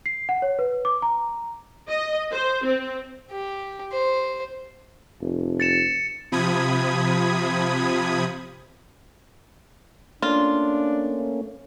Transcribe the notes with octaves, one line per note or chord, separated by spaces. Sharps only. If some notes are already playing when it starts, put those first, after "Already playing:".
C7
F#5
C#5
B4
D6
A#5
D#5
C5
C4
G4
C5
F1
A6 C#7 E7
C3 F3 B5 D#6 G#6
A3 A#3 C#4 D4 F4